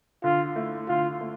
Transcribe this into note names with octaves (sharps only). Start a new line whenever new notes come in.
D3 F4
A3 E4
D3 F4
A3